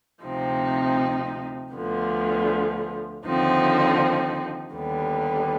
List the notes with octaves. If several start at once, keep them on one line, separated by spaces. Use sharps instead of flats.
D2 C3 F3 C4 D#4
D2 D3 F3 B3
D#2 D3 F3 C4 D#4
D#2 D3 G3 B3